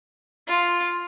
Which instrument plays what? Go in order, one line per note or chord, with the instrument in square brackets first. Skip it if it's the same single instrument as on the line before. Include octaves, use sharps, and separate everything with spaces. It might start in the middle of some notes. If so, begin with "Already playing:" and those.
[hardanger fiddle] F4